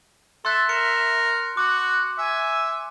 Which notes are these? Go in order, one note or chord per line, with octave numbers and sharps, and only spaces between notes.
A4 E5 C6 F#6
A#4 C#7
F#4 D6 F#6
E5 G#5